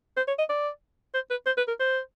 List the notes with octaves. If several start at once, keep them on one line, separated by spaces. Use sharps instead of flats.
C5
C#5
D#5
D5
C5
B4
C5
B4
A#4
C5